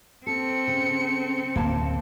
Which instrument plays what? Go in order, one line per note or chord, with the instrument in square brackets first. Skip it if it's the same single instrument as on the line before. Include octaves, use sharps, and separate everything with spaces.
[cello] C4 [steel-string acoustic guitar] A4 [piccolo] C#7
[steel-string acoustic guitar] C#3 A4
[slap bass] D1 [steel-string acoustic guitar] A#3 F5 A5